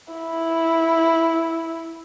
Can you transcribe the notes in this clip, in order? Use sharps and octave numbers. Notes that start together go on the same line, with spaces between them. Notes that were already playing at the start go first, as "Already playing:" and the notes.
E4